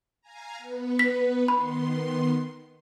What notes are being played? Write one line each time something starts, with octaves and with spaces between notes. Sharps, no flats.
F5 G#5 A#5
B3 B4
B6
D#3 B3 B5 C6